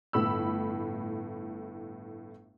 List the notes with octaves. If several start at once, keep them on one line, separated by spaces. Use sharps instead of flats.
G1 A2 B5 E6